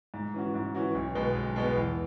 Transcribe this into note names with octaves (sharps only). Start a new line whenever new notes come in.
G#2
E3 C#4 F#4
G#2
E3 C#4 F#4
B1
B2 G#3 B3
B1
B2 G#3 B3
E2